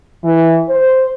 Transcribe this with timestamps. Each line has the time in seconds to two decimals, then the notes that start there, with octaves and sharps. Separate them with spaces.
0.24 E3
0.69 C5